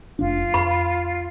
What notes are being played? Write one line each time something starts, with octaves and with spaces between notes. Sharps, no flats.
F1 D4 F4
F2 B5